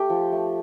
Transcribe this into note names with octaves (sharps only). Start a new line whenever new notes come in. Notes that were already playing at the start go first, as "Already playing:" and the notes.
Already playing: A3 G4
F3
A3